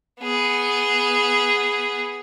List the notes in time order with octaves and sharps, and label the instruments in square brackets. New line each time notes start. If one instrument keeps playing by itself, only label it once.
[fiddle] B3 G#4